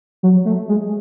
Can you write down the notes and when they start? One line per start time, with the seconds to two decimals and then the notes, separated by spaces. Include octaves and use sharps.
0.23 F#3
0.45 A3
0.69 G#3